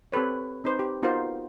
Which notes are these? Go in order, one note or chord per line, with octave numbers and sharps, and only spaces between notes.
C4 G4 A4 B4 C#5
C4 D#4 B4 C5
G4
B3 D#4 F4 F#4 A#4 C5